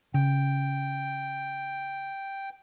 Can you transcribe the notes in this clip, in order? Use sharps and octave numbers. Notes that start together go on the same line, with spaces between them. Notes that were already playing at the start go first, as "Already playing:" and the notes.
C#3 G5